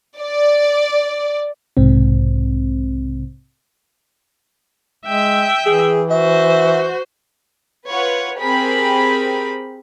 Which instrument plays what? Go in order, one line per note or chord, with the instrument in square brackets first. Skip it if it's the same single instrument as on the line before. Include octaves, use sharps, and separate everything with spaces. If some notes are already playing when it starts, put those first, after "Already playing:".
[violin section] D5
[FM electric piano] B1 G#2 C3 C4
[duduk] G#3 [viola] E5 G5
[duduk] E3 [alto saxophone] G#4
[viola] F#4 C5 [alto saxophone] E5
[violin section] F4 B4 C#5 F#5
C4 G4 G#4 A#4 B5